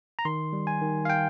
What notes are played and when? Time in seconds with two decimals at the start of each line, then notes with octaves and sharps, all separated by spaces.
0.19 A#5
0.25 D#3 C6
0.53 G3
0.67 G#5
0.82 D#3
1.05 F5
1.10 G5